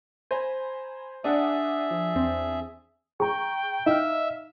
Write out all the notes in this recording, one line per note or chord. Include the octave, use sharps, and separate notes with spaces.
C5 G#5 A#5 B5
D4 G#4 D5 E5 F#5 D#6
F3
E2 C4
G#4 G5 A#5 C#6
D#4 E5 F5 F6